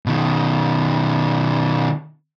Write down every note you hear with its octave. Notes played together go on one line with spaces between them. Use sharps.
B2 D#3